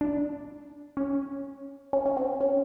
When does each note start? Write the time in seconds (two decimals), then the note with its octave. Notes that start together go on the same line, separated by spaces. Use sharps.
0.01 D4
0.97 C#4
1.93 C#4
2.06 C#4
2.17 C4
2.41 C#4